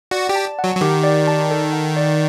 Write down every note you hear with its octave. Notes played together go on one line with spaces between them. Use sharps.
F#4 D5
G4
A5
F#5
F#3
F#3
D#3 G4
D5
A5
A4
F#5
D5